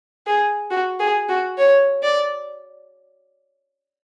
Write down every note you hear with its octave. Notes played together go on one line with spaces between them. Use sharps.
G#4
F#4
G#4
F#4
C#5
D5